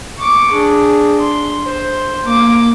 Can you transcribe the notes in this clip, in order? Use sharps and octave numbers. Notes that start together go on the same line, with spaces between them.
C#6 D6
D4 G#4
C6
C5
A#3 D6